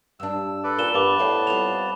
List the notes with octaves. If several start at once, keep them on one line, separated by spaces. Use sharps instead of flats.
G2 D4 E6
A4 B4 D5
A#2 E7 G7
G2 B3 A5 B5 D6
A2 C5 D5
G3 C4 F4 F7